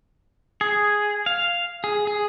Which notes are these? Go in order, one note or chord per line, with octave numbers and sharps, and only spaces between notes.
G#4
F5
G#4
G#4